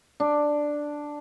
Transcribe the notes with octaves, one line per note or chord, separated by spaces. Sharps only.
D4